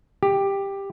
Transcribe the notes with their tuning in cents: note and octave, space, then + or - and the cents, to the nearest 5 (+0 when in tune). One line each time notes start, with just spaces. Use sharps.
G4 +10